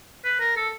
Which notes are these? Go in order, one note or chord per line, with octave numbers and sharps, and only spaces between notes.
B4
A#4
A4